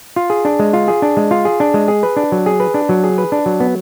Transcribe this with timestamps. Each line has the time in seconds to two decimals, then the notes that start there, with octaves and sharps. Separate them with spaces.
0.16 F4
0.30 G#4
0.45 D4
0.59 G#3
0.73 F4
0.88 G#4
1.02 D4
1.17 G#3
1.31 F4
1.45 G#4
1.60 D4
1.74 G#3
1.88 G#4
2.03 B4
2.17 D4
2.32 F#3
2.46 G#4
2.60 B4
2.74 D4
2.89 F#3
3.04 G#4
3.18 B4
3.32 D4
3.46 F#3
3.60 B3